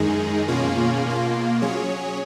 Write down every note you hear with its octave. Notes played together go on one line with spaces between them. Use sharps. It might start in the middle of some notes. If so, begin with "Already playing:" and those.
Already playing: F#2 D#3 G#3 D#4 G#4
B2 A#3 C#4 F4 G#4
B2 A#3 F4
F#3 C#4 G#4 C#5